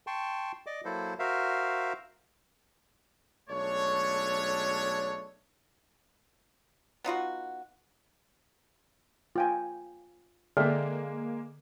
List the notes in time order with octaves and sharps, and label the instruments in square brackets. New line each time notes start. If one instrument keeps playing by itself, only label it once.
[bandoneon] G5 A5 C6 C#6
D5 D#5 D6
F#3 A#3 E4 A4 C5
F#4 A#4 C5 E5 F5
[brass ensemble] B1 G#3 A3 D4 C#5
[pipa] B3 D#4 F4 F#4
[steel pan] F4 G5 G#5
[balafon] D3 [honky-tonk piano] G#3 A#3 [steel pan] D5 E5 G5